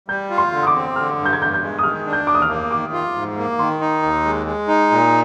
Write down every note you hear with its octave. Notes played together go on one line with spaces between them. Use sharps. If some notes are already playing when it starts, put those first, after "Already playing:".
G3 G6
F4
C6
D3
D#6
D6
C4
D3 F6
G2
G6
G#6
G2 G6
G6
G#3
D#6
D#3 F6
D4
G6
D#2 D6
D#6
F6
A#3
D#3 D6
F4
G#2
A#3
D#3 C6
D#4
D#2
G#3
G#3
D#4
A#2